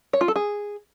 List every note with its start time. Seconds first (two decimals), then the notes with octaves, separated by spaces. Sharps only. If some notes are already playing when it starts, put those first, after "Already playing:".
0.13 C#5
0.21 F4
0.28 A4
0.36 G#4